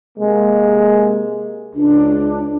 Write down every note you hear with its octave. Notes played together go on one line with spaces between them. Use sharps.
C3 G#3 A#3
C#2 D4